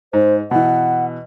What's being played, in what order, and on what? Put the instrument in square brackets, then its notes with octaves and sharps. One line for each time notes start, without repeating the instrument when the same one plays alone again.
[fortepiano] G#2 [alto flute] C5
[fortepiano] B2 E3 [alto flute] F#5